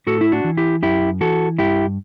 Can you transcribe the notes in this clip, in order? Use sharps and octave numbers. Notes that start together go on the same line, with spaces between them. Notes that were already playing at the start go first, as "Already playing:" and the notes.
A2 F#4 A4
E4
D4 F#4
E3
E4 G4
F#2 E4 G4
E3 F#4 A4
G2 E4 G4